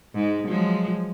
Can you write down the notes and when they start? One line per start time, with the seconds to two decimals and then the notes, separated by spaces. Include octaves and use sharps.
0.14 G#2 G#3
0.48 F3 F#3 G#3